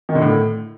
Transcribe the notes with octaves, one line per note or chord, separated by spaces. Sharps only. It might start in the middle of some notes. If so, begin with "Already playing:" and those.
D#3
D3
A2